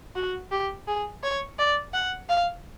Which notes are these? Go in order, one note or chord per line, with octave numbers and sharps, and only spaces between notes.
F#4
G4
G#4
C#5
D5
F#5
F5